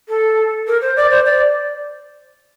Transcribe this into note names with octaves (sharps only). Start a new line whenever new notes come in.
A4
A#4
C5
D5
C5
D5